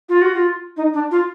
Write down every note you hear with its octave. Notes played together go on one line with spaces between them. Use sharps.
F4
F#4
F4
D#4
D4
F4